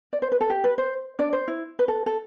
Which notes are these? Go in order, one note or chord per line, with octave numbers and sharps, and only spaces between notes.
D5
C5
B4
A4
G4
B4
C5
D4 D5
C5
E4
B4
A4
A4